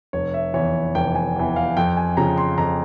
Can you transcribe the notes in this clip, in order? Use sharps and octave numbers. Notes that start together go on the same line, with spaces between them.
F1 C#5
E5
E2 E3 C#5
F1 G5
G#5
E2 E3
F5
F2 G5
G#5
C#3 F3 A#5
C6
F2 A#5